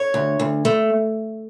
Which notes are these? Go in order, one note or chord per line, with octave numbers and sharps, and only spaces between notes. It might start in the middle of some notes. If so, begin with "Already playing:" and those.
Already playing: C#5
D2
D2
A3